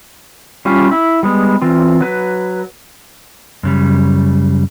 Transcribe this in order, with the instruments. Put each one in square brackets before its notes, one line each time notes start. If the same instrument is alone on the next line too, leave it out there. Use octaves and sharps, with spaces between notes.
[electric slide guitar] G3 C#4 F4 G4
E4
G3 G#3 B3
E3 C4 F4
F#3 B4
F#2 C#3 G3